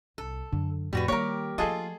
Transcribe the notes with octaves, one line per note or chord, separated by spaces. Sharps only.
C2 A4
F#2 D3
F2 A2 G3 F#4 B4
D#3 G3 A#3 G4 A#4 C#5
F3 A3 F4 G#4 A4 D#5